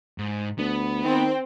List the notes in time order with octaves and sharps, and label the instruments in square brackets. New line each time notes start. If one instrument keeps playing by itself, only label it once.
[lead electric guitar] G#2
[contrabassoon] D2 [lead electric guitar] B3
[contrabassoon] D#3 [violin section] C4